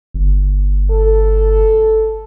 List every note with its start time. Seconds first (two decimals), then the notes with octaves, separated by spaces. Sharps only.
0.14 G1
0.91 A4